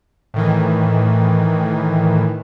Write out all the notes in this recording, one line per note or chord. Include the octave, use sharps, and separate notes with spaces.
A2 D#3 E3